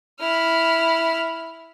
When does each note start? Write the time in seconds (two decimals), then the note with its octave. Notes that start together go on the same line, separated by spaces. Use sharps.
0.20 E4 F6